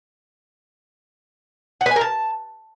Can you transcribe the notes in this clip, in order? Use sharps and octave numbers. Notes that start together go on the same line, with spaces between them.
F#5
B4
G#5
A#4
A5